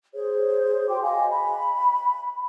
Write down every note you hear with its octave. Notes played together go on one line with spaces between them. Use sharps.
G#4 C5 C#5
F#4 G5 C6 D6
D#5 F5 G#5
B5